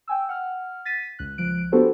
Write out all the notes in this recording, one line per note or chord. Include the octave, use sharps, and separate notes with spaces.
G5 G#5 E6
F#5 F6
A6 B6 D#7
C#2 F#6
C#2 F3 F#6 D7
B3 D4 F#4 G4 A4 C5